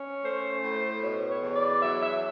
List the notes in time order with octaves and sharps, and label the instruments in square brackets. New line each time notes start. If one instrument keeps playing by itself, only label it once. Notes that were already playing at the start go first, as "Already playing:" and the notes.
Already playing: [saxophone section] C#4
A3 C5
A2
B2 C#5
C#5
E2 C#5
D5
F#3 E5
E5